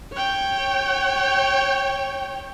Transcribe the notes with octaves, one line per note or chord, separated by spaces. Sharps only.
C#5 G5